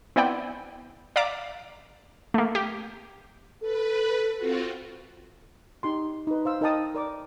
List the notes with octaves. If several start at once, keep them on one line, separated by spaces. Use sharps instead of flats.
B3 C4 E4 D5 F#5 G5
D5 E5 F5 A#5 D6
A3 A#3
G4
A4 B4
C4 F4 F#4
D#4 G4 C6
D#4 B4
C5 F5 E6
D#4 A#4 D#5 G5 A5 D#6
A#4 D5 D6